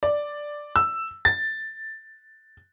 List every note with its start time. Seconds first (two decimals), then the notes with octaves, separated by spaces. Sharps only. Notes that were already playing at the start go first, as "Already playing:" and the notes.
0.03 D5
0.76 E6
1.25 A6